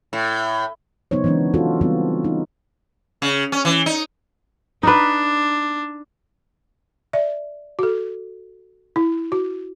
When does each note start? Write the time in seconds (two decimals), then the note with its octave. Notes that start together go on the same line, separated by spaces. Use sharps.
0.13 A2
1.11 C#3 F#3 B3 D#4 C5 C#5
1.24 E3 G#3 B3 C#4 D4
1.54 D#4 F4 F#4 A4
1.81 C#3 E3 G3 B3 C4 F4
2.24 D#4
3.22 C#3
3.52 C#4
3.65 E3
3.86 D#4
4.83 D4 D#4 B4
7.13 D5 E5
7.79 F#4 A4
8.96 E4
9.32 F#4